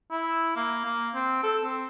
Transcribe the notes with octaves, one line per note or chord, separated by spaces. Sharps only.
E4
A#3
A#3
C4
A4
C4